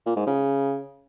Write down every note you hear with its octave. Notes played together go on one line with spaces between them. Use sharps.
A#2
G#2
C#3